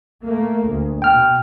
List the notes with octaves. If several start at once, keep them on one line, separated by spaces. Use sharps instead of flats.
A3 A#3
D2
B2 G5 F6